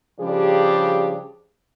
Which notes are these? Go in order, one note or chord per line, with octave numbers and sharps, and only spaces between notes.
C#3 F3 G3 D4 G4 G#4